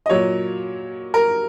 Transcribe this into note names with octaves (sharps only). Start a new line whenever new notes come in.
D#5
A#2 F#3 C#5
A#4